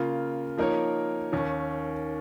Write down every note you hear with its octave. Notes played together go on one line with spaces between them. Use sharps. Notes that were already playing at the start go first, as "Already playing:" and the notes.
Already playing: C#3 A#3 F4
F3 A#3 D#4 A#4 C#5
D#2 D#3 C#4